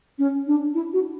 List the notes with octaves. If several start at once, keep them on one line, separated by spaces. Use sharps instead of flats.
C#4
D4
E4
F#4